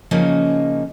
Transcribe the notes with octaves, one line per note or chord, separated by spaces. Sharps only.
C#3 F3 A#3 C#4 D#4